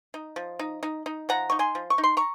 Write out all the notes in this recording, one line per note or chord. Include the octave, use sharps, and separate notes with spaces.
D#4
F3
D#4
D#4
D#4
F3 F#5 A#5
D#4 C#6
G#5 C6
F3
C#6
D#4
C6
A#5 C#6